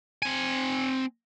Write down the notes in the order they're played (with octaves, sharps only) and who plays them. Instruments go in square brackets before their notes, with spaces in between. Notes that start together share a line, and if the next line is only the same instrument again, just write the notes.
[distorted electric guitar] C4 G#5